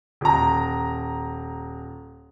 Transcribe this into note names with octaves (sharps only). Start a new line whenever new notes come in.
D#1 A#5